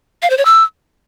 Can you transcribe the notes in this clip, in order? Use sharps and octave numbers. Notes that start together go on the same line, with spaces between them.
F5
C5
C#5
E6